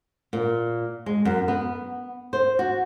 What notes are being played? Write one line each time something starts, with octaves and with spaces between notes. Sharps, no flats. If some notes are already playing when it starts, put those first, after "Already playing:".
A#2
G#3
F#2
B3
C5
F#4